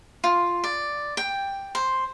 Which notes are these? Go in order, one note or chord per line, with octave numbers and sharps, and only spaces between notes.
F4
D5
G5
C5